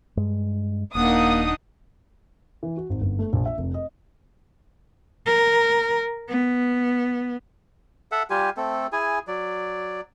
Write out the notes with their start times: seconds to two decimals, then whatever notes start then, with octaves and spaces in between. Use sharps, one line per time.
0.17 G2 G#3
0.95 D#1 A#3 D4 D#4 F#5 D#6
2.63 E3
2.77 F#4
2.89 G#1
3.01 G1
3.19 A3
3.33 A#1
3.46 E5
3.58 F1
3.74 D#5
5.26 A#4
6.29 B3
8.12 A4 E5 F#5
8.30 G3 F4 G4 G#5
8.57 A3 C4 A4
8.92 E4 G#4 G#5
9.28 F#3 D5